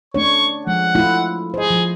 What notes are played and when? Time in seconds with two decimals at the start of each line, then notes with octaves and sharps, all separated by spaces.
0.14 A3 D4 C#5 C#6
0.67 F3 G#3 F#5
0.95 A3 E4 F4
1.54 G#4 C5 D#5
1.71 F3